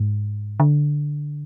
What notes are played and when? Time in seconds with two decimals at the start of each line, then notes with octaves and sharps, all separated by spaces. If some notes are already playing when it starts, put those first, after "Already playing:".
Already playing: G#2
0.60 D3